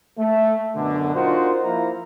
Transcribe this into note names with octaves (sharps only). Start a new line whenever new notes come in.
A3
F#2 B2 D3
D4 D#4 F4 F#4 A#4 C5
F3 A#3 E4 C5 F5 A#5